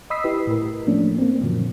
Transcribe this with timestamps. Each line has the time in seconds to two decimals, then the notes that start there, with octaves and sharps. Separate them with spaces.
0.10 D#5 B5 D#6 E6 B6 C7
0.24 E4 G4 B4
0.47 A2 A#4
0.87 F3 A3 A#3 C#4 D4
1.18 A#3 C4
1.41 F#2 A#2 D3 F3 F#3